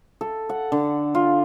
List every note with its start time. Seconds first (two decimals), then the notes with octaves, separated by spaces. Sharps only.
0.21 A4
0.49 F#5
0.72 D3
1.15 F4